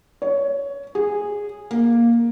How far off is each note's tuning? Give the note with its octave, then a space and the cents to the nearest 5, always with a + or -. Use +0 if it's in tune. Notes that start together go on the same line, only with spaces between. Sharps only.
C#5 +15
G#4 -10
A#3 +5